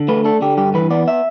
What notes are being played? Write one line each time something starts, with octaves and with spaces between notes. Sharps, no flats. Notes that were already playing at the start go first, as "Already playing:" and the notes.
Already playing: D3
A3 B4
D4 A4
D3 G4
G2 G4
E3 B4
B3 D5
E5